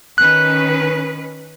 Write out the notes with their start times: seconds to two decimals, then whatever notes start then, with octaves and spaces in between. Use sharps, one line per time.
0.18 D#3 C#4 B4 F#6